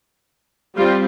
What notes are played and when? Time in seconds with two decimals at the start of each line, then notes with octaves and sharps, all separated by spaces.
0.76 G3 C4 F4 G4